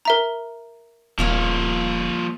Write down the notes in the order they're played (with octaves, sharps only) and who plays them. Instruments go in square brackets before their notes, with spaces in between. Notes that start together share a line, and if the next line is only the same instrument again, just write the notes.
[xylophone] A#4 E5 A#5
[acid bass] D#1 [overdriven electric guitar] F3 C#5 [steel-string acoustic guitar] G3 A#3 F5